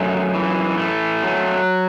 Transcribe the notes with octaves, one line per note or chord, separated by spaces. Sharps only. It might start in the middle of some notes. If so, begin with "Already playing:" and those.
Already playing: F#2 A3
E3
A3
F#3